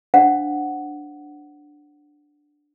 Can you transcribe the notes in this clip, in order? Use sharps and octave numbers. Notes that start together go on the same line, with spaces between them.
D4 C5 F5 F#5